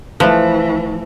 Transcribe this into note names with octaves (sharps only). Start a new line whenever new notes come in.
E3 F3 A3 B4